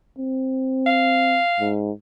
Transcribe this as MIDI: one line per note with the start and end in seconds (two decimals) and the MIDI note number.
0.18 1.40 60
0.86 1.70 77
1.60 1.91 44